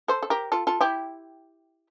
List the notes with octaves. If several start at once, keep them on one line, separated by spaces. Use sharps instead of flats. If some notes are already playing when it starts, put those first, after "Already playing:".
A4 C5
A4
G4 A#4
F4 A4
F4 A4
E4 G4